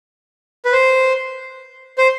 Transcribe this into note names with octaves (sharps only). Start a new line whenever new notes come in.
B4
C5
C5